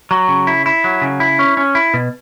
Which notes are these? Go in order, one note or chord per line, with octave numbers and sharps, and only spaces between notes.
F#3
C#3
E4
E4
F#3
C#3
E4
C#4
C#4
E4
B2